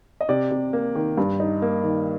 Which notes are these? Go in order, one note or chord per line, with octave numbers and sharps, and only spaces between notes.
D#5
C3 D5
C3
A#3
D#3
G2
D#4
A#3
D#3